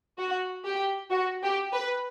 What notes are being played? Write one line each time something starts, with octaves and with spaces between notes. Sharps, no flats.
F#4
G4
F#4
G4
B4